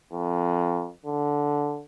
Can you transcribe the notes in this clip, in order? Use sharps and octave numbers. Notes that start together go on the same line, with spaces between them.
F2
D3